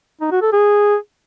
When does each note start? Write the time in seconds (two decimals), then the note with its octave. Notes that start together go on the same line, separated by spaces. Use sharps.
0.21 D#4
0.32 F#4
0.42 A4
0.53 G#4